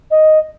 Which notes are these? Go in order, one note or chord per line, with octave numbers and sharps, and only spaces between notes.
D#5